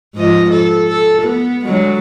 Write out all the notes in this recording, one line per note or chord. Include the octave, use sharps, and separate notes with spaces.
G#2 F3 D#5
A4
A4
B3
D3 F#3 G#3